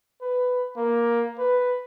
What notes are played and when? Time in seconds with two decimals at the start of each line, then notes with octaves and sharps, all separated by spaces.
0.22 B4
0.77 A#3
1.38 B4